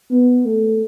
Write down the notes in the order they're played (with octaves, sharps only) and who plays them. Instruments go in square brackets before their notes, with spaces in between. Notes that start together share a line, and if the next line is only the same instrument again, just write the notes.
[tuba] B3
A3